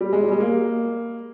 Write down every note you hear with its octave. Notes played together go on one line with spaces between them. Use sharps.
G3
G#3
G3
G#3
A#3